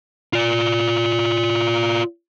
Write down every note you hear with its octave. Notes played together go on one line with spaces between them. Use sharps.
F4 D5